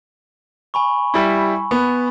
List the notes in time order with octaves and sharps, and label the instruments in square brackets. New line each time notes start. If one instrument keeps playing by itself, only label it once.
[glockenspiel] G#5 B5 C#6
[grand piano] G3 E4
B3